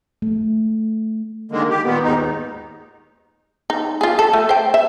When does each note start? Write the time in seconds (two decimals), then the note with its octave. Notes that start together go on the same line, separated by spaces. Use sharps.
0.22 A3
1.51 D3 D#3 G#3 A#3
1.70 G4
1.85 A#2 D#3 B3
2.03 D#2 G#2 D#4
3.70 D#4
4.01 F4 G#4
4.19 A4
4.33 A3
4.49 C5 G5
4.74 E5